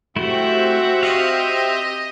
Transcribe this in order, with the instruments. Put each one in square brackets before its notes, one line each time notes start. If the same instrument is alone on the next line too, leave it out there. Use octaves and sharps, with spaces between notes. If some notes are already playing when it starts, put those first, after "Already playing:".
[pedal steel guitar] A3 E4 [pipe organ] C4 G4 E5 [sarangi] F#4
[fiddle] D#5 [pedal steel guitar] F5